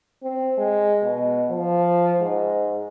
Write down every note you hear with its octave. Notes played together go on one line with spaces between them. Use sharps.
C4
G#3
B2
F3
G#2